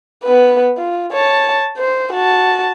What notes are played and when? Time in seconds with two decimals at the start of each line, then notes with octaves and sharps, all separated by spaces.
0.23 B3 B4
0.77 F4
1.13 C#5 A5
1.78 C5
2.13 F#4 A5